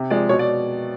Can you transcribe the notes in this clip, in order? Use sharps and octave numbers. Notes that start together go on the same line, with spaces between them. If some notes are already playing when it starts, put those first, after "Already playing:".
Already playing: C3
F3 G#3 D5
B2 C#5
D5